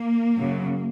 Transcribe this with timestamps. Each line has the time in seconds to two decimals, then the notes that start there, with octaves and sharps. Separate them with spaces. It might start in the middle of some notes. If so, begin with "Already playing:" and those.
Already playing: A#3
0.37 F#2 C#3 F#3